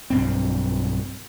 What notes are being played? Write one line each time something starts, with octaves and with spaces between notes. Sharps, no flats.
B1 G2 C4